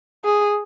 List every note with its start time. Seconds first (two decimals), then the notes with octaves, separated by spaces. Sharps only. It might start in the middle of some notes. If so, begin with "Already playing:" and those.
0.25 G#4